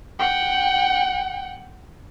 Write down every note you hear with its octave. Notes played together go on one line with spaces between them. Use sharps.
F#5 G5